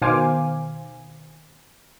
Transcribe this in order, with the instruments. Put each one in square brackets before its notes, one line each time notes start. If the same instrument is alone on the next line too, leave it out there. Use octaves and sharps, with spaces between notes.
[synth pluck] B2 D#3 C5 F5 G#5 D6